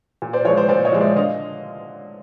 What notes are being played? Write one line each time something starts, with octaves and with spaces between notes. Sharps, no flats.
A#2
C5 D5
F3 G#3 B4 C#5
C5 D5
A#2 C5 D5
C#5 D#5
F3 G#3
D5 E5
D3 D#5 F5